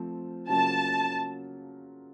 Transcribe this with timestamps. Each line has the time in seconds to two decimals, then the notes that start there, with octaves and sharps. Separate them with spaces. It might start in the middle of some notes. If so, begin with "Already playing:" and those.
Already playing: F3 A3 C4
0.49 C#3 F#3 A#3 C#4 F4 A5